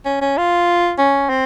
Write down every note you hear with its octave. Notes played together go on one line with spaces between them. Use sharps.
C#4
C#4
F4
C#4
C4